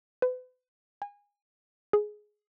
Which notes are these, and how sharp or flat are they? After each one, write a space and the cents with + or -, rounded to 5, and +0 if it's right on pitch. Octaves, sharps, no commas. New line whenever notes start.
B4 +40
G#5 -25
G#4 +15